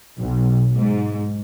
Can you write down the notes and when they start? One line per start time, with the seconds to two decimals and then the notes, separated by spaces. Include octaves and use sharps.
0.17 B1
0.76 G#2